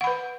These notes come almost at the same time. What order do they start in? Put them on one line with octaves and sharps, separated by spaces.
F#5 B5 B4